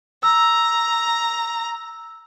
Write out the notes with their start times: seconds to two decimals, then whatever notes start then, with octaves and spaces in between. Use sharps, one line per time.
0.23 A#5 E6